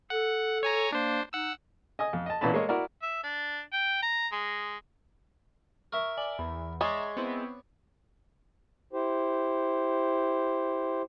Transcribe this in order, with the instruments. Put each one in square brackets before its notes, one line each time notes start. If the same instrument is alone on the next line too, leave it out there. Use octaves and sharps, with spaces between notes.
[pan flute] A4 [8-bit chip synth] F#5
[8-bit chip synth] C#5 G#5 A#5
[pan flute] A#3 [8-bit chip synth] D4 C5
[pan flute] D#4 [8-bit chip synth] F#5 E6
[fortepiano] D#5 G#5 D#6
F2
D#5 A5
A#2 E3 B3 C#4 A5 B5
G#3 A#3 A4 C#5 D#5
E4 F#4 A#4 D5
[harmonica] E5
D4
G5
A#5
G#3
[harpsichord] A#4 E5 [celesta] C#6
[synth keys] D5 [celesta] G#5 F#7
[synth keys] E2 [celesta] B5
[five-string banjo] G#3 [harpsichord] C#5 D5 [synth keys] E5 A#5 [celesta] C#6 G#6 C7
[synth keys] B3 C4 E4
[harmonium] E4 G4 C5